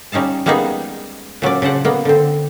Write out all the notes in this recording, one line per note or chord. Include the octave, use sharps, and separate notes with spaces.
G3 C#4 D#4 F5 A5
G3 G#3 A#3 B3 D#4 G#4
A#2 F#3 C#4 D5
C#3 D4 C5 F#5
A#3 B3
D3 C4